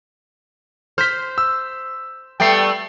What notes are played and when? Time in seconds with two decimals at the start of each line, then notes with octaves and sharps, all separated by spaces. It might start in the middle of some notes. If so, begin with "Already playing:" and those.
0.98 C5 F6 B6
1.38 E6
2.40 G3 A3 B3 G5 C7